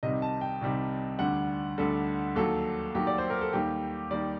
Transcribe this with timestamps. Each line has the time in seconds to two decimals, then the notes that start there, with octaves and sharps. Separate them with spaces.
0.03 C2 C3 D#3 G3 D#5
0.22 A5
0.41 G5
0.61 C2 C3 D#3 G3
1.19 D2 D3 G3 F#5
1.78 D2 D3 G3 A4
2.36 D#2 D#3 F#3 A4
2.94 D#2 D#3 F#3 G4
3.07 D5
3.18 C5
3.30 A#4
3.41 A4
3.53 D#2 D#3 G3 G4
4.11 D#2 D#3 G3 D5